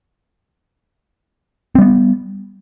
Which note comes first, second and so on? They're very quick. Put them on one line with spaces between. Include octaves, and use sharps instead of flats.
C4 G3 B3